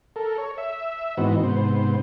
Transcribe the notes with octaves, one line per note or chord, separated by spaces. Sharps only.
A4 A#4
C#5
E5
G#2 E3 B3 C4 D#4 F#4
G#2 C3 B3 C5